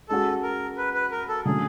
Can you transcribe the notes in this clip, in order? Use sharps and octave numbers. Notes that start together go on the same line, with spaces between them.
G#3 C#4 F#4 A4
A#4
B4
B4
A#4
A4
D3 F#3 A3 C#4 G#4